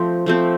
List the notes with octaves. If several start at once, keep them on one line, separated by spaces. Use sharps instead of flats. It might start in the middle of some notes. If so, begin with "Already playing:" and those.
Already playing: F3 A3 C4
F3 A3 C4